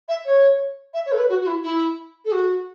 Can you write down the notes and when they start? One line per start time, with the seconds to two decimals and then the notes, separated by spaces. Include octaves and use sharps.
0.08 E5
0.25 C#5
0.93 E5
1.06 C#5
1.12 A4
1.17 B4
1.29 F#4
1.41 F#4
1.46 E4
1.63 E4
2.25 A4
2.32 F#4